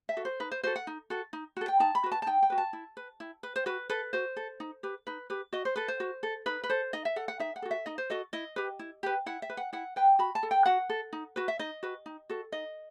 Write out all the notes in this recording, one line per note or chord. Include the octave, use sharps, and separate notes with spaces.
E5
F#4 A4
C5
D#4 B4
C5
F#4 A4 C5
F#5
D#4
F#4 A4
D#4
F#4 A4
G5
D#4 A5
B5
F#4 B4
A5
A5
D#4 G5
G5
F#4 B4
A5
E4
B4
E4
B4
C5
F#4 B4
A4 B4
F#4 C5
A4
D#4
G4 B4
D#4 B4
G4 B4
F#4 D#5
C5
A4 B4
C5
F#4
A4
D#4 B4
B4
A4 C5
D#4 D#5
E5
A4 F#5
F#5
D#4 E5
F#5
F#4 A4
E5
D#4 D#5
C5
F#4 A4 D#5
E4 D#5
G4 B4
E4
G4 B4
E4 F#5
E5
B4
F#5
E4 F#5
B4 G5
F#4 B5
A5
A4
G5
F#4 F#5
A4
D#4
F#4 B4
E5
D#4 D#5
F#4 B4
D#4
F#4 A4
D#4 D#5